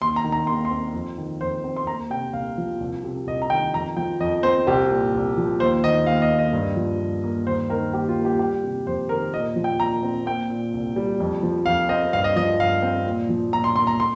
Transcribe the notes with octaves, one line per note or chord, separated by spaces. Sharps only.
D#2 C6
A#5
D#3
A#5
D#2 C6
C6
C4
F2
D#3
F2 C5
C4
C6
A#3 A#5
C3 G5
C2 F5
F3
C2
C3
C2 D#5
A#5
D#3 G5
F2 A#5
F3 G5
F2 D#5
C4 C5
C2 G4
A#2
C2
F3
D#2 C5
D#3 D#5
D#2 F5
D#5
A#3
D#5
G2
F3
G2
A#3
D#2 C5
D#3 A#4
D#2 G4
F4
A#3
G4
G3 G4
C3
F2 C5
D#3 A#4
A#2 D#5
F3
G5
A#2 A#5
C4
A#3 G5
A#2
C2
G3
F2
F3
F2 F5
C4 D#5
G2 F5
D#5
F3 D#5
G2 F5
C4
A#2
F3
A#2 A#5
C6
A#3 C6
A#5
C6